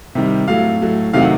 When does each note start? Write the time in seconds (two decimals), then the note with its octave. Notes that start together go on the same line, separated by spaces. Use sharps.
0.15 C3 D#3 G3
0.48 A2 F#3 A3 F5
0.81 A2 F#3 A3
1.13 C3 D#3 F#3 A3 F5
1.21 F#5